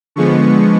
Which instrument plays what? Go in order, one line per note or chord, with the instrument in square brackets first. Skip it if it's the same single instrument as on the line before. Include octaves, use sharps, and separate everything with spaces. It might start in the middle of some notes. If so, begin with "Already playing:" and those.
[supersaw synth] D3 F3 G#3 B3 C#6